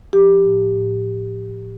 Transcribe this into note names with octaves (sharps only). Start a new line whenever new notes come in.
F3 G4
A2
A2